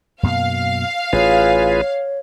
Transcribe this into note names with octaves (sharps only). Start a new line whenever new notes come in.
F#2 B2 A#3 F5
A1 F4 G#4 B4 C#5